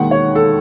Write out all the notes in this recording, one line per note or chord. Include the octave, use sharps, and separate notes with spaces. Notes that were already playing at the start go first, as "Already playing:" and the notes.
Already playing: E1 D#2 D#3 F#5
C#5
A4